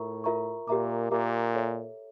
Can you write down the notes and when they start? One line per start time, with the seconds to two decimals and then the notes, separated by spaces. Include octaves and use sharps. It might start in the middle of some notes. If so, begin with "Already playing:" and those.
Already playing: A2 F4 A#4 E5 A#5 C#6
0.24 F4 A#4 E5 A#5 C#6
0.68 A#2 G4 A#4 E5 A#5 D6
1.11 A#2 G4 A#4 E5 A#5 D6
1.55 A4 C#5 E5